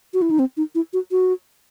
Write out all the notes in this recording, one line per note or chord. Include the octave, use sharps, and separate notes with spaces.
F#4
E4
D#4
C4
D#4
E4
F#4
F#4